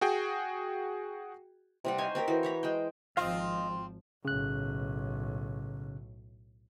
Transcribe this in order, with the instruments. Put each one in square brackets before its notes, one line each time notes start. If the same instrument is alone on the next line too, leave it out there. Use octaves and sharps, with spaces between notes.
[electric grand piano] F#4 G#4 G5
[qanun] C3 G3 F#5
D#4 C5 C#5 G#5
C4 G4 A#4
E3 F#4
C#5 A#5 B5
G#3 C5 G5
[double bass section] G#1 F3 [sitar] C4 F4 [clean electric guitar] D#5 F5
[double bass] B1 A2 [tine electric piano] C#3 F#6